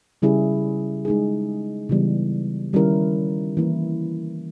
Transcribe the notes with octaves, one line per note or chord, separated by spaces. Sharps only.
C#3 G3 C#4 E4 G#4
G#3 D#4 G#4
C#3 E3 G3 B3
D#3 G3 C#4 E4 A#4
E3 A#3 E4 A#4